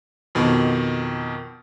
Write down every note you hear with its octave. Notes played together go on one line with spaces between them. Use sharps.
F2 B2 D#3